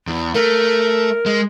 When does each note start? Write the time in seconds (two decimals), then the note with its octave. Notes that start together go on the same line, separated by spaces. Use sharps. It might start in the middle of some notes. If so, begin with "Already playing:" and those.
0.07 E2
0.34 A3 A#4
1.26 G#3